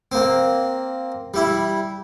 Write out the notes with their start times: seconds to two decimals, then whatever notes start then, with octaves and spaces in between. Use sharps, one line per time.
0.12 A#3 C4
1.34 G3 E4